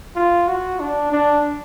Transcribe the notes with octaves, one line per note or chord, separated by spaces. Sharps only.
F4
F#4
D4
D4